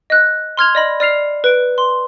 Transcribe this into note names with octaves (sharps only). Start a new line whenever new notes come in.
D#5 F#6
C6 F6 G#6 F7
D5 D#5 B5
D5 F6 C7 F7
B4 D7
C6